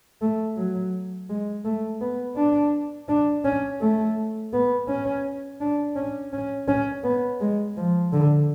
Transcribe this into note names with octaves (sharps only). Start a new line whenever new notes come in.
A3
F#3
G#3
A3
B3
D4
D4
C#4
A3
B3
C#4
D4
C#4
C#4
C#4
B3
G#3
F3
D3